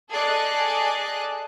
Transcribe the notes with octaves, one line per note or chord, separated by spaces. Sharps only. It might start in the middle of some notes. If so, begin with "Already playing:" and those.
G#4 A4 D5 D#5 F#6